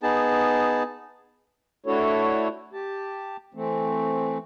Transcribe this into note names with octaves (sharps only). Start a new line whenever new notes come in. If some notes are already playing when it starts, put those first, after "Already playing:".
B3 D#4 G#4 A5
A3 D4 E4 F#4 A4 C#5
G4 A5
E3 A3 C4